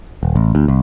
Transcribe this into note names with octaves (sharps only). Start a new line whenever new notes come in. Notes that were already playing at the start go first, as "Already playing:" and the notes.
D#1
A1
D2
C2